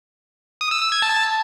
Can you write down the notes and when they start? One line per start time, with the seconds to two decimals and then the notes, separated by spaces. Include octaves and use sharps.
0.61 D#6
0.71 E6
0.82 E6
0.92 G#6
1.02 A5